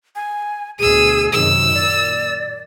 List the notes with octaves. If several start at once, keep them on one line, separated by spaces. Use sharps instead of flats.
G#5
D2 B2 G#4 E6 D#7
F#2 C3 D#3 E6
A#2 D5